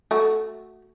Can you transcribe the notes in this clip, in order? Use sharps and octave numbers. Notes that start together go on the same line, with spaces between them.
A3 F#4